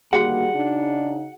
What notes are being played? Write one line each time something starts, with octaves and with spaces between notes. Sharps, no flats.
D2 D#3 G3 A#3 F#4 G#4 F#5
C#3 D4 D#4